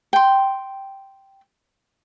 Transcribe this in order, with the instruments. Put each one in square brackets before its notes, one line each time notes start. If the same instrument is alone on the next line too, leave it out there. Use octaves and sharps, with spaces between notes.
[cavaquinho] G5 C6